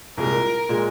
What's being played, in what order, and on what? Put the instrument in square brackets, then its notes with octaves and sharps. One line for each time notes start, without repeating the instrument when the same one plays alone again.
[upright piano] C2 A#2 G#3 [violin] A#4
[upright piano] A#2 G#3